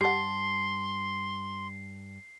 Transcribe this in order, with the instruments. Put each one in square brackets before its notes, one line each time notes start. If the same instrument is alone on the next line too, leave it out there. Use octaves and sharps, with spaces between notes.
[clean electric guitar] G2 A5 [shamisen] G4 F#5 [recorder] C6 [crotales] C7